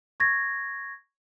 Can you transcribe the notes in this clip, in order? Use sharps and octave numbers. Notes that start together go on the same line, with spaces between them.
C#6 G#6 A#6